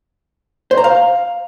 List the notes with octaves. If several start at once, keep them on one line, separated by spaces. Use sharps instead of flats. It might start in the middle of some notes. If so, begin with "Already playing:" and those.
C5
A#5
F5